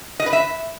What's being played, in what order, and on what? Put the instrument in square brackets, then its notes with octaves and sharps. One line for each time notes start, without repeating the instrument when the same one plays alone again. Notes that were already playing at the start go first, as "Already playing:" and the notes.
[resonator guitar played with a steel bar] D#5
B4
E5